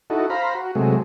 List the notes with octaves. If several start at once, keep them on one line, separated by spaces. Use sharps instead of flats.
D#4 E4 F#4 A4
C5 F5 A#5 B5
F#4
C3 F#3 G#3 A3